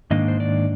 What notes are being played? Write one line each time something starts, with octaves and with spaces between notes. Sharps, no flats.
G#2 D#3 A#3 D4 D#5
C5
D5